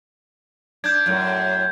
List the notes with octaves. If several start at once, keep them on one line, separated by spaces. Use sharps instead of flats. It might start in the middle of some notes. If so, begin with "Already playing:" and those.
D4 G6 G#6
F#2 A2